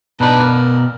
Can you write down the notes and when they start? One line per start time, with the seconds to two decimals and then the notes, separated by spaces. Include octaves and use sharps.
0.20 B2 D4 D#4 B4 D5
0.42 A#4